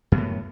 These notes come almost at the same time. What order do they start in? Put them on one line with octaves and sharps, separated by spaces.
F#2 B3 A2